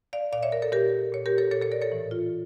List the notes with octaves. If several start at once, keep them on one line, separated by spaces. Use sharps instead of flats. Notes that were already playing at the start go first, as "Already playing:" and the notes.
D5 F5
A#2 D5 F5
C#5 E5
A#4 D5
A4 C#5
A#2 G4 A#4
A#2 C#5
G4 A#4
A4 C#5
A#2 A4 C#5
A4 C#5
A#4 D5
A4 C#5
A2 E3
F4